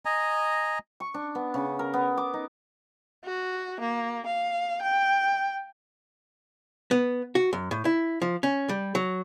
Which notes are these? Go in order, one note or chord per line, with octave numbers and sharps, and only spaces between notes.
D#5 G#5 A#5
C#6
D4
B3
C#3
A#4
B3
D6
D#4
F#4
A#3
F5
G5
B3
F#4
F#2
A2
E4
F3
C#4
G3
F#3